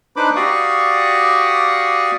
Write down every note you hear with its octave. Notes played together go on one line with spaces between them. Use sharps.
D4 D#4 B4 C5 B5 D6
F#4 G4 D5 F5 C#6 D#6